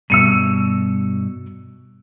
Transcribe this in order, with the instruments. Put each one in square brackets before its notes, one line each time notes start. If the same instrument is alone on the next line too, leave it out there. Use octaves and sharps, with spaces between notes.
[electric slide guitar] G2 B2 [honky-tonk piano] E6 C#7 D#7